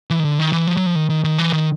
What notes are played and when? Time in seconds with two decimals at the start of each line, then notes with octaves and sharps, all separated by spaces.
0.10 E3
0.20 D#3
0.25 D3
0.39 D#3
0.53 E3
0.67 F3
0.77 F#3
0.86 F3
0.95 D#3
1.10 D#3
1.24 D#3
1.38 E3
1.53 D#3